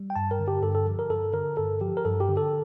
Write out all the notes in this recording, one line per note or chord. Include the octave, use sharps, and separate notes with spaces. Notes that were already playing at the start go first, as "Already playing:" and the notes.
Already playing: G3
G5
G2 A5
A#4
D3
G4
G2 A4
A4
F3
A#4
G2 A4
D3 A#4
G2 A4
F3 G4
A#4
G2 A4
G4
D3
A4